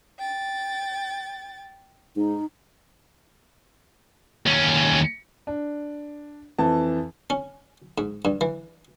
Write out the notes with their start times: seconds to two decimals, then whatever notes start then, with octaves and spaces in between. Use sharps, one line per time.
0.18 G5 A6
2.17 G#2 D#4
4.46 D#2 C#4
5.47 D4
6.59 F2 E3 A5
7.30 C#4
7.98 G#2
8.25 G2
8.41 E3